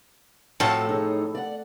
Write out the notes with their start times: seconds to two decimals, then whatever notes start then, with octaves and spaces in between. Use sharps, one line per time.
0.60 A2 F3 A3 C4 F4 F#4 A4
0.89 D#4 G#4 C#5
1.35 D5 F#5